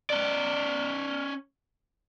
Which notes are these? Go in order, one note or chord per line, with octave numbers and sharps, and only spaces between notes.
C#4 D5